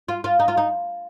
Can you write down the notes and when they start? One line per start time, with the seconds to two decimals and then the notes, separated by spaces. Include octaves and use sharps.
0.08 F4
0.24 F4
0.39 D#4
0.48 F4
0.57 D#4